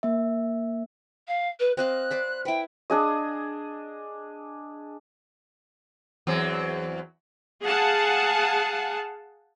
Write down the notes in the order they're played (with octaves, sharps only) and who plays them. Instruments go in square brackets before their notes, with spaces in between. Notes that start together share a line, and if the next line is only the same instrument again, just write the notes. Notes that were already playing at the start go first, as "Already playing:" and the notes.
[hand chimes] A#3 E5
[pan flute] F5
B4
[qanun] C4 D#5 F5 [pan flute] F#6
[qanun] C5 D5 B5
[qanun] E4 B4 [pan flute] G5
[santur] D4 G#4 D#5
[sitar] E2 F#3 C4
[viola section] G#4 F5 F#5 G#5 A5